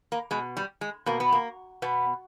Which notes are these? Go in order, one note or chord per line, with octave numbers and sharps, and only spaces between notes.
A#3
B2 G#3
G3
G#3
B2 A#3
B3
A#3
B2 B3